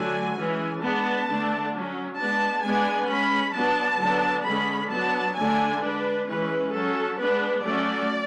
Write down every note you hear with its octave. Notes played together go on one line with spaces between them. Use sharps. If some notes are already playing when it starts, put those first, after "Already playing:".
Already playing: D3 F#3 A3 D4 G#5
E3 G#3 C#4
G#3 B3 D4 A5
D3 A3 D4
F#3 C#4
G#3 B3 D4 A5
G#3 B3 D4 G#5
G#3 C#4 B5
F#3 B3 D4 A5
D3 F#3 B3 D4
D3 G#3 C#4 B5
F#3 B3 D4 A5
D3 A3 D4 G#5
G#3 D4 B4
E3 G#3 C#4 B4
F#3 C#4 A4
G#3 B3 D4 B4
F#3 A3 C#4 D5